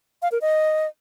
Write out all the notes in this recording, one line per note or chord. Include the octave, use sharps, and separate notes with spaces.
F5
A#4
D#5